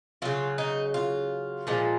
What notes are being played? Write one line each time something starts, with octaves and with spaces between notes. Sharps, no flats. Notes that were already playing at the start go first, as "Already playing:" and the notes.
C#3 F#3 F4
D#4
F4
A#2 F3 G#3